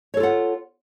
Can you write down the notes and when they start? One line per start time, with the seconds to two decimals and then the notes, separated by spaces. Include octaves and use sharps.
0.14 C#5
0.17 A4
0.20 F4
0.23 F#5